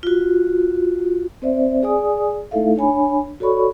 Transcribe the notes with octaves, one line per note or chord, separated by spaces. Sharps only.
F4 F#4
C4 C5 D5 E5
G#4 D5 G#5 D#6
A3 D#4 E4 A4 E5 F5
D4 C#5 G#5 B5
F#4 A4 C#5 D5 B5 C#6